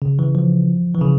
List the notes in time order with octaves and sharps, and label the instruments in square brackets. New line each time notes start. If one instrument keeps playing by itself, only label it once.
[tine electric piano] C#3
E3
F3
E3
C#3